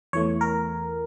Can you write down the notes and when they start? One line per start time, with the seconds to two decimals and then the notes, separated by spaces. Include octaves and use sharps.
0.13 E2 E3 A3 C#5
0.41 A#4